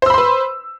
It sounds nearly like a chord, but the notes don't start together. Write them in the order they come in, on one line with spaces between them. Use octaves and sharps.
C5 E6 B5 C6 B4